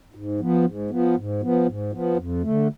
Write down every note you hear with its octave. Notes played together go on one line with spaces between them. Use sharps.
G#2
F3 B3
G#2
F3 B3
G#2
F3 B3
G#2
F3 B3
F2
D3 A3